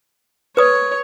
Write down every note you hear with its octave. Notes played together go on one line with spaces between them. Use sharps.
B4 C#5 D#6